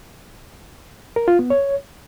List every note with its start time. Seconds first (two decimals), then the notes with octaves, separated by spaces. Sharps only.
1.16 A#4
1.28 F4
1.39 B3
1.50 C#5